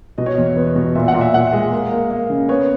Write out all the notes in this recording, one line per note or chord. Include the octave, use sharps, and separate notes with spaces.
B2 D#5
C#5
E2 D#5
B3
B2
A#2 E5
F#5
A#2
E5
A#2 F#5
E5
G#3
A#3
A#3
A#3
C#3
B3 C#5